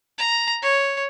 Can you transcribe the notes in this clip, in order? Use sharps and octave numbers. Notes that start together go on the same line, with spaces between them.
A#5
C#5